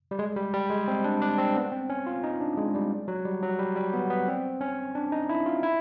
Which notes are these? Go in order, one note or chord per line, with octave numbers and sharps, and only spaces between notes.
G3
G#3
G3
G3
G#3
C4
D4
D4
C4
B3
C4
C#4
F4
D#4
D4
G#3
G3
F#3
G3
F#3
G3
G3
B3
B3
C4
C#4
D4
D#4
E4
F4
E4